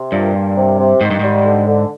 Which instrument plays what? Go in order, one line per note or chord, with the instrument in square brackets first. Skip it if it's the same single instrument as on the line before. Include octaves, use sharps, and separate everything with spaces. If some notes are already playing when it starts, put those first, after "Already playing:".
Already playing: [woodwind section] C3
[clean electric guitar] G2 [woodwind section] A#2
[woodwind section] A#2
C3
C3
[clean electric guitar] G#2 [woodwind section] D#3
[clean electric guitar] G2
[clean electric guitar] G#2 [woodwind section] G3
[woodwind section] D3
D3